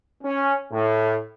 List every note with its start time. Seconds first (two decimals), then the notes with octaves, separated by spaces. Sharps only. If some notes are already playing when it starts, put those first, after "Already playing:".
0.23 C#4
0.72 A2